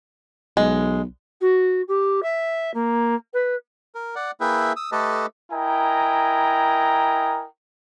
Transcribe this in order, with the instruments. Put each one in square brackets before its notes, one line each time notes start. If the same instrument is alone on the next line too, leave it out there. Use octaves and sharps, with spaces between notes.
[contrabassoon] B1 [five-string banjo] G#3
[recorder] F#4
G4
E5
A#3
B4
[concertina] A#4
D5 F#5
A#3 E4 G#4 B4 E5 G5
D#6 E6
A3 G4 A4 B4 D#5 A5
[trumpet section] E4 A#4 D#5 G5 G#5 A#5